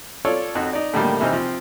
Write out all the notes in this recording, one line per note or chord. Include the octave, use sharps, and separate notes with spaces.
F4 A4 C#5 D5
F2 D#4 F#4
D#4 D5
A2 D3 D#3 G3 A3 A#3
C3 E3 D#4 C5 F6
F3 C4